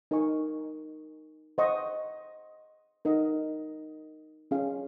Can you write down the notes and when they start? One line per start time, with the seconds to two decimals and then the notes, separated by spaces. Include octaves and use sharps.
0.11 D#4 A#4 D#5 G#5 C#6
1.58 C5 D#5 F#5 C#6
3.05 D#4 A#4 D#5 F#5
4.51 C#4 F4 G#4 C#5 F5